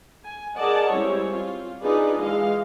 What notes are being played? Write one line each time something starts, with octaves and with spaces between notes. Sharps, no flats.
G#5
G#4 A#4 D5 D#5 F#5 A5
G3 G#3 C4 C#4 E4 C#5
F4
D4 D#4 F4 G#4 B4 D5
E3 G#3 D#5 F5